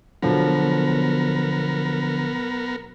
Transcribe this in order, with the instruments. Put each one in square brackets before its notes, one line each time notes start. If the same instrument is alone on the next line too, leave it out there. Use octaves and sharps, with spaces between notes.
[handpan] B2 F#3 [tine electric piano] D3 F3 [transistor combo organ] B3 A#4